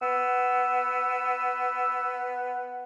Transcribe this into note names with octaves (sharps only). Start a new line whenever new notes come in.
B3 E6